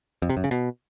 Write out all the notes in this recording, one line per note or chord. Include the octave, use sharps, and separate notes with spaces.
F2
C3
F#2
C#3
B2